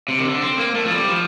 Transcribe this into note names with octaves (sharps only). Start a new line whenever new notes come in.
C3
D#3
D3
C4
A#3
A3
F3
G3
F3